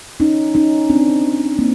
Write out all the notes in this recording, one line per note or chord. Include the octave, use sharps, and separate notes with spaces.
C#4 D#4
C#4 D#4
C4 D4
A#3 C4